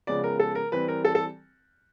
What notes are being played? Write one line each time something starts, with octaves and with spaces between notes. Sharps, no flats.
C#3 F3 G#3 B3 D5
A#4
A4
A#4
E3 G3 C4 B4
A#4
A4
A4